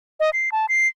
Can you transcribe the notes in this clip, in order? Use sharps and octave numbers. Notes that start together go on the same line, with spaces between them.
D#5
C7
A5
C7